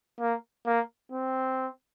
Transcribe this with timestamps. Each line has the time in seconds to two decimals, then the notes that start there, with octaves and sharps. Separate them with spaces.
0.20 A#3
0.66 A#3
1.12 C4